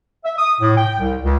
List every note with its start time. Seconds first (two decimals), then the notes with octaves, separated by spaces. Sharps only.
0.25 E5
0.38 D#6
0.60 A2
0.77 G5
1.00 C2
1.23 C#2